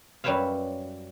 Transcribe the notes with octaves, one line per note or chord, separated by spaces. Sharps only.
F#2 G3 B4 C#5 E5 F5